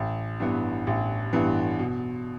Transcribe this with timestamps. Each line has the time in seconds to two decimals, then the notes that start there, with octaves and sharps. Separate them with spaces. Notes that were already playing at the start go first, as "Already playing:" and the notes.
Already playing: A1
0.40 G2 E3 B3
0.87 A1
1.33 G2 E3 B3
1.79 B2